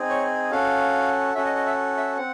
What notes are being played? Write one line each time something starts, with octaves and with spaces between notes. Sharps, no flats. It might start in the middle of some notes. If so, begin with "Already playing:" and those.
Already playing: C4 D#4 G#4
C#5
C#4 F#4 A4 F5
C#4 F#4 A4 E5
D#5
D#5
E5
E5
C4 F#5